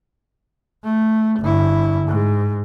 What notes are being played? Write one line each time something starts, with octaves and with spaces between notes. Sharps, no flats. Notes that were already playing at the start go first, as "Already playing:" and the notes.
A3
G1 E4
G#2